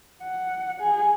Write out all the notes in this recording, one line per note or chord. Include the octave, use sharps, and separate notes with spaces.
F#5
G#4